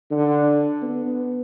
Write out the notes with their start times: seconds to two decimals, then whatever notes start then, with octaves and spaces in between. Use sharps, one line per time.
0.11 D3
0.82 B3